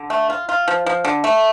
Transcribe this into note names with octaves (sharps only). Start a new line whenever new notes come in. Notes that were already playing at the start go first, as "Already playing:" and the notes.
Already playing: D3
A3
F4
F4
F3
F3
D3
A3